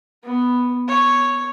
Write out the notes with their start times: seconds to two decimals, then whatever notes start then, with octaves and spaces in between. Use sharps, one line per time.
0.24 B3
0.88 C#5